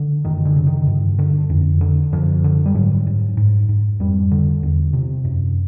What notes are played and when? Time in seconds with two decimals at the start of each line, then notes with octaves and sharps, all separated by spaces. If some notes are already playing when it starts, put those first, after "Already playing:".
Already playing: D3
0.25 F#2 D#3
0.45 D3
0.56 C#3
0.67 D#3
0.87 G2
1.19 D3
1.50 F2
1.81 D3
2.12 F#2 F3
2.44 D3
2.66 G3
2.75 G#2 F#3
3.07 G#2
3.37 G#2
3.69 G#2
4.00 F2 G3
4.31 D3
4.63 E2
4.93 C3
5.25 F#2